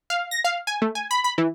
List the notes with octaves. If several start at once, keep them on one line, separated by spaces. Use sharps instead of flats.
F5
A#6
F5
G#5
A3
G#5
B5
B5
E3